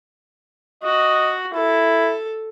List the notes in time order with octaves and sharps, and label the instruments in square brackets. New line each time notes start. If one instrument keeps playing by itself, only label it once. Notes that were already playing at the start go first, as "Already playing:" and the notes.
[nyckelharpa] F#4 [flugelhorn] D#5
[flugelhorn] E4 [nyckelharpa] A4